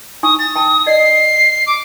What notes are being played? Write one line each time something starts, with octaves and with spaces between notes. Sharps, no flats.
D#4 G#5 C#6 D#6
A6
G5 A5 D#6
D5 D#5 C7
D6